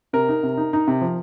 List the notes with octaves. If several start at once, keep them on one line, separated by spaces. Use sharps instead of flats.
C3 A#4
D#4
C3
D#4
D#4
C3
F3